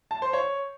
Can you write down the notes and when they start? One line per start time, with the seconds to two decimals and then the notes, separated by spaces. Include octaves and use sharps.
0.11 A5
0.22 C5
0.33 C#5